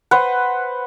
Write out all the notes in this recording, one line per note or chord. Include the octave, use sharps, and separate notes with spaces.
B4 C5 F#5